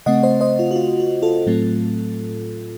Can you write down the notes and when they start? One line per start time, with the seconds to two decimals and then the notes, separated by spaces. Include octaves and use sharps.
0.06 C#3 A3 C4 D#5 F#5
0.23 C5 D#5
0.41 C5 D#5
0.59 F4
0.71 F#4
0.76 F4
1.00 F#4
1.22 F4 A4
1.46 A2 F#3 A3 C4